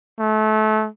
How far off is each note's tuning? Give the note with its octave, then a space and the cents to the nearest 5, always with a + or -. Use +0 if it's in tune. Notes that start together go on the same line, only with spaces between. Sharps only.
A3 -30